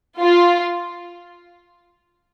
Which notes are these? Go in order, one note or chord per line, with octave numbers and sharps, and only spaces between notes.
F4